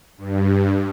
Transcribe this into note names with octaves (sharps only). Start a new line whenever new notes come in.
G2